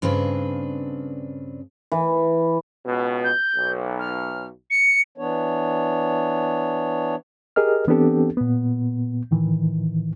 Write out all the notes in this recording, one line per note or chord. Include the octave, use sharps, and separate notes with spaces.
G2 C#3 C4 D4 B4
E3
C#2 B2
G6
B1
F6
C#7
E3 B3 D4 C#5
G4 G#4 A#4 D#5 F6
E3 B3 C4 D4 G4 A4
A#2 B3
A2 D#3 E3